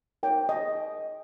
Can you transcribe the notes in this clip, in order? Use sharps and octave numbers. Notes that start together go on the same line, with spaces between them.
D#4 A#4 C#5 G5
D#5